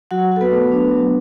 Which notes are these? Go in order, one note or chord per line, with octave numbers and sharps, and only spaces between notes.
F#3 F#4 F#5
F#4 A4
B3 B4
A3
D4
F#3